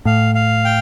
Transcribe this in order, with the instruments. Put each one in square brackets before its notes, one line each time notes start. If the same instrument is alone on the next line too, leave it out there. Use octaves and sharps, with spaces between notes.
[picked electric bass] A2 [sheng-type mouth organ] F5
[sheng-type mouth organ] F5
G5